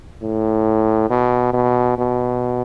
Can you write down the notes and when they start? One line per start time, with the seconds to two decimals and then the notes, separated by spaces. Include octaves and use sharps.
0.22 A2
1.10 B2
1.53 B2
1.98 B2